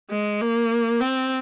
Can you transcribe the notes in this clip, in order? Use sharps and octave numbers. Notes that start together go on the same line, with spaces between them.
G#3
A#3
C4